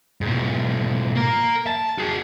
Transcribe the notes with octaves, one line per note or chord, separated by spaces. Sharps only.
G#2 B2
A#3 A#4
A5
F#4 G#4